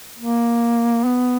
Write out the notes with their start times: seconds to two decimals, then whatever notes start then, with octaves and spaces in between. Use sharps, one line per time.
0.19 A#3
1.05 B3